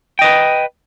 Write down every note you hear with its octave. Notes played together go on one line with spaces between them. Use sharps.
B4 D#5 G5